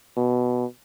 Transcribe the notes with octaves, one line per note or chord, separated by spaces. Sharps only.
B2